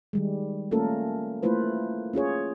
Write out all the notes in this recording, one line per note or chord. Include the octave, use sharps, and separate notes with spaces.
D#3 G3 G#3
A3 A#3 C#4 F4 A4 A#4
A3 A#3 E4 F4 B4 C5
C#4 F4 G#4 C#5